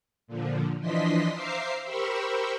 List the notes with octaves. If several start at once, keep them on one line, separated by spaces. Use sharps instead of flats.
A#2 D3 F3
E3 F3 D4 D#5 C6 B6
C5 E5 F5 A#5 D6 C7
G4 A#4 C5 B5 C#6 E6